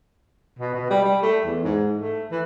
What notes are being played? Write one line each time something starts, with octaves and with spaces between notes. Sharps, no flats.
B2
B2
G3
G3
A3
E2
G#2
A3
E3